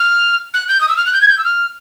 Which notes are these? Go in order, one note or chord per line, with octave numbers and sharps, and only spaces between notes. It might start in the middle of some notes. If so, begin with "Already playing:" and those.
Already playing: F6
F#6
G6
D#6
E6
F6
F#6
G6
G#6
G6
E6
F6